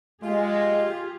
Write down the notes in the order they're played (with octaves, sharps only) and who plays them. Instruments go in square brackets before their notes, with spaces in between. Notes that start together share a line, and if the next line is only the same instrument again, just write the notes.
[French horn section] G#3 [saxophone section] F4 [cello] G4 G#4